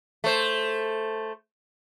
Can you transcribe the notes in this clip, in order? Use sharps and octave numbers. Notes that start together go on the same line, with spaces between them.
A3 C5